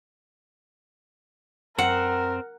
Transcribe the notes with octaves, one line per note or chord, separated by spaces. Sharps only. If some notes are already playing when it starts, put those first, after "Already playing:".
F#2 C4 A#4 F#5